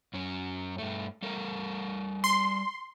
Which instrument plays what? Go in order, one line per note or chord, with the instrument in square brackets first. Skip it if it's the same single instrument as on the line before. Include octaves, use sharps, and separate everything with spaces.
[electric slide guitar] F#2 C#4
G2 A3
G3 A4 A#4
[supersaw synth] C6